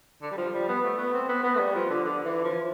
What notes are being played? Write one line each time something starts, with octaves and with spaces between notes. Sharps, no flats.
D3
G3
F3
G3
B3
A3
B3
C4
B3
B3
A3
G3
F3
D3
D3
E3
F3